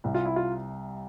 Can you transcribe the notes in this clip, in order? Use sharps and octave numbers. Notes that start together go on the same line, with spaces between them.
C2 C3 G3
F4
E4
F4